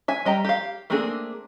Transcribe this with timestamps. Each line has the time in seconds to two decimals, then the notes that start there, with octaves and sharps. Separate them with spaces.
0.08 E5 G#5
0.25 G3 D#5 G5 A#5
0.45 G4 F5
0.90 A3 A#3 C4 D4 G#4